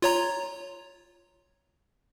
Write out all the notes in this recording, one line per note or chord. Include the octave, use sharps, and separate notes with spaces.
F4 C#5 A#5